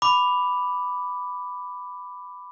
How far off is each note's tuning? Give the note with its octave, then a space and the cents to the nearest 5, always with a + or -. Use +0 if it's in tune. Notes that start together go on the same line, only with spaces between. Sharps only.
B5 +5 D6 +0